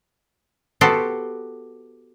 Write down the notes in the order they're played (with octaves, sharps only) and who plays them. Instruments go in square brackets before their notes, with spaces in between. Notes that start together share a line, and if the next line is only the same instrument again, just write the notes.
[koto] B3 F#4 G4 A4 C5